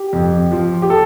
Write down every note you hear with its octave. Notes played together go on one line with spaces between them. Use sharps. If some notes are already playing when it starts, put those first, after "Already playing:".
Already playing: G4
F2
F3
G4
A4